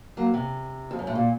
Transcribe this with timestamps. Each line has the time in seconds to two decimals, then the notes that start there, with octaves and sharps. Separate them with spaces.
0.17 F#3 A#3
0.34 C3
0.91 F2
0.99 F#2
1.07 A2
1.15 A#2